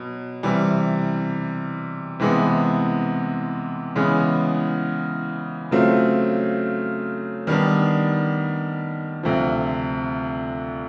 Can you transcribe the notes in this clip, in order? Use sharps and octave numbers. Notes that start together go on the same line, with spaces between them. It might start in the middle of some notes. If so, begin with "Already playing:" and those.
Already playing: B2 F#3
C3 E3 G3
C3 E3 G#3 B3
C#3 E3 G#3 B3
C#3 F#3 A3 C4 F4
D#3 G3 B3 D4
D2 C3 F3